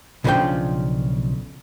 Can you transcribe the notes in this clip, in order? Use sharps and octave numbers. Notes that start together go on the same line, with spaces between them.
B1 C#3 F3 D4 F4 G5